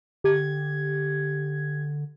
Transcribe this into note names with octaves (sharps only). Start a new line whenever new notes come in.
D3 G4 G#6